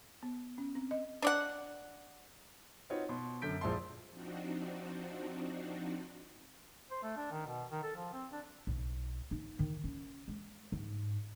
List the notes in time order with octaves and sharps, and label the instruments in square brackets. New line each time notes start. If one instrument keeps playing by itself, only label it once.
[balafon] B3
C#4
C4
D#5
[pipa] D4 D5 F#5
[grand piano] C4 D#4 F4 F#4 B4 C#5
B2 B5 C6
F#2 D3 A4 G6 B6 D7
A#1 F3 G#3 E4 A5 C6
[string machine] F3 C4 D4 D#4 F#4
[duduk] C5
A3
D4
D#3
B2
D#3
A4
F3
C4
D4
[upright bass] B1
D#4
D#3
C#4
G#3
G#2